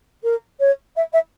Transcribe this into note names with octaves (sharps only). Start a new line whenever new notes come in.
A#4
C#5
E5
E5